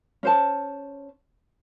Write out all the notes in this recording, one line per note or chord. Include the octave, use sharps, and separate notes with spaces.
C#4 C5 A5